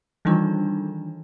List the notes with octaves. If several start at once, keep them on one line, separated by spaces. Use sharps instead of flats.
D#3 E3 G3 D4 D#4 F4